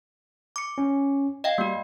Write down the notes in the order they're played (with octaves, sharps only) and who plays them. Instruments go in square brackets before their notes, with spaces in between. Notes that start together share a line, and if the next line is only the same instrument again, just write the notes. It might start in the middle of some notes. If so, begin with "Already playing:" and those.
[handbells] D6 C#7
[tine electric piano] C#4
[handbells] D#5 F5 G5
[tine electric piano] G3 [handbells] A#3 F#4